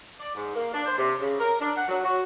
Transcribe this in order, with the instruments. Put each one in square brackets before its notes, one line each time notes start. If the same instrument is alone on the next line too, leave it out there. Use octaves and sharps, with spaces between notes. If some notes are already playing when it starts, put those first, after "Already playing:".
[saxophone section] D5
G#2
A#3
D4
C5
C3
C#3
A#4
D4
F#5
F#3
F#4